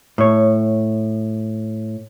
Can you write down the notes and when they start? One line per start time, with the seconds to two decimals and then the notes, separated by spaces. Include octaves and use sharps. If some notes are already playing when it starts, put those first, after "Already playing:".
0.18 A2 C#5